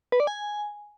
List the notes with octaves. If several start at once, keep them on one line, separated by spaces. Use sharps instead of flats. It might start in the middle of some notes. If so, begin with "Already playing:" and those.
B4
D5
G#5